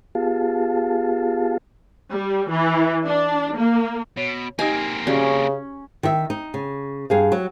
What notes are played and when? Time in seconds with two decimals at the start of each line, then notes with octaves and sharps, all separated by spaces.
0.15 B3 F4 G4 G#4 F5 A5
2.13 G3
2.49 E3
3.05 D4
3.56 A#3
4.17 B2 C#5
4.59 A#3 C4 D#4 G4 D#5 G#5
5.07 C#3 C#4 F#4 G4 D5
6.03 D#3 E5
6.30 D#4
6.54 C#3
7.10 G2 G#4 F5
7.32 F#3